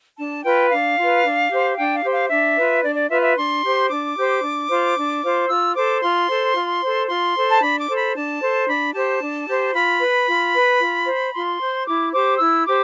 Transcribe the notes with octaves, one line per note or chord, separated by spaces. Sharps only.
D4 A5
F4 B4 G5
D4 F5
F4 B4
D4
G4 C5
D4 G5
F5
G4 C5
F5
D4 E5
F4 B4
D4 D5
D5
F4 B4 E5
E5
D4 C6
G4 C5
D4 D6
G4 C5
D4
F4 C5
D4
F4 C5
F4 E6
A4 C5 D6
F4 C6
A4 C5
F4
A4 C5
F4 C6
A4 C5
A5
D4 B5
D6
A4 C5
B5
D4 A5
A4 C5
D4 B5
G4 C5 A5
D4
G4 C5
F4 B5
B4
F4
B4
F4
C5
F4 C6
C5
E4 D6
G4 C5 D6
E4 E6
G4 C5 D6